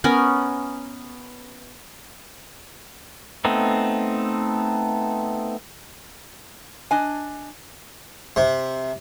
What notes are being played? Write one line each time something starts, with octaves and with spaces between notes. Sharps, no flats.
B3 C#4 A#4 G#5
A3 B3 C4 D#4
D4 D#5 G#5
C3